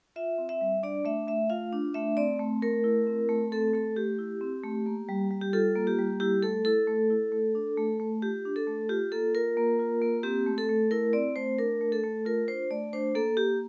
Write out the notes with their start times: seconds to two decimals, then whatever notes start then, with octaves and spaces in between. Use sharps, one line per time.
0.16 F4 E5
0.38 C4
0.49 E5
0.61 G3
0.83 D4 D5
1.05 A3 E5
1.27 A3 E5
1.50 F4 F5
1.73 D4
1.94 A3 E5
2.17 C4 D5
2.39 A3
2.62 A3 A#4
2.84 E4
3.07 C4
3.29 A3
3.52 C4 A4
3.74 A3 A4
3.96 A3 G4
4.18 E4
4.41 C4
4.63 A3
4.86 A#3
5.08 G3
5.31 G3
5.41 G4
5.53 F4 A4
5.76 A#3
5.87 G4
5.99 G3
6.20 E4 G4
6.42 A3 A4
6.65 E4 A4
6.87 A3
7.10 E4
7.32 A3
7.55 D4
7.77 A3
8.00 A3
8.22 F4 G4
8.45 D4
8.56 A4
8.67 A3
8.89 F4 G4
9.12 A#3 A4
9.35 F4 A#4
9.57 A#3
9.79 F4
10.01 A#3
10.23 C4 G4
10.46 A3
10.58 A4
10.69 A3
10.91 E4 A#4
11.13 C4 D5
11.36 A3 C5
11.59 D4 A#4
11.81 A3
11.92 A4
12.04 A3
12.25 F4 A#4
12.48 D4 C5
12.71 A3 D5
12.93 D4 C5
13.15 A#3 A4
13.37 A#3 G4